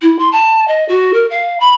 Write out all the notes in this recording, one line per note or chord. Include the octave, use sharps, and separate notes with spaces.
E4
C6
A5
D#5
F#4
A#4
F5
B5